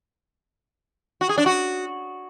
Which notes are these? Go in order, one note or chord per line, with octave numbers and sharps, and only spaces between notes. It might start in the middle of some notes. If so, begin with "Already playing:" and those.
F#4
G#4
D4
F#4